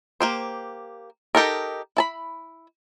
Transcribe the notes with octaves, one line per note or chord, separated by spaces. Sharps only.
A#3 G4 C5
D#4 G4 A4 A#4
E4 A5 B5